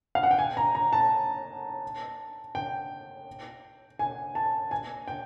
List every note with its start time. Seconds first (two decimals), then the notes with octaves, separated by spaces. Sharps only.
0.15 F5
0.23 F#5
0.31 G5
0.38 G#5
0.57 A#5
0.75 A#5
0.93 A5
2.55 G5
3.99 G#5
4.35 A5
4.71 G#5
5.08 G5